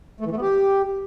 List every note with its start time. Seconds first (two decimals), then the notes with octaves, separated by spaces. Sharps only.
0.20 A3
0.26 E3
0.31 A3
0.36 B3
0.41 G4